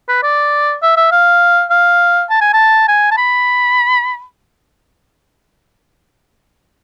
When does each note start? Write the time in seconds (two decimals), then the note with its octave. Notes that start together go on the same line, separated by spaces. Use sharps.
0.09 B4
0.23 D5
0.82 E5
0.97 E5
1.12 F5
1.71 F5
2.30 A5
2.41 G#5
2.53 A5
2.88 G#5
3.11 A5
3.17 B5